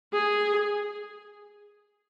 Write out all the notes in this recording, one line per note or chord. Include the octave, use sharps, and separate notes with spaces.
G#4